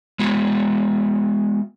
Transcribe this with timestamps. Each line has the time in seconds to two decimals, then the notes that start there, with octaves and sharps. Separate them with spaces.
0.19 G#3 B3 F#4